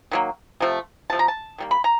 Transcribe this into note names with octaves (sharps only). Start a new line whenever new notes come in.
D#3 F#3 A#3
C3 F3 A3
C3 F3 A3 A5
A#5
A5
D#3 G3 A#3
B5
A#5